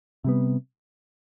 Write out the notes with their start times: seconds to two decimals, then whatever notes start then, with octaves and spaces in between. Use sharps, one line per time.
0.24 C3 G3 B3